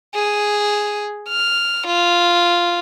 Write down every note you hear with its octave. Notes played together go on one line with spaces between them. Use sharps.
G#4
F6
F4